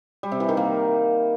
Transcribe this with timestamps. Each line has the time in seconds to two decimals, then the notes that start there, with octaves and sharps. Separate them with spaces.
0.23 G3
0.32 C3
0.40 E3
0.49 D#3
0.57 A#3